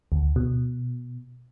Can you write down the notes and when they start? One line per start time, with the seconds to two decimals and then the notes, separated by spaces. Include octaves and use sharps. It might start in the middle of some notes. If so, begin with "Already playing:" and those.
0.12 D2
0.36 B2